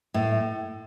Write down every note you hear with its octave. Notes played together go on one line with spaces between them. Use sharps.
A2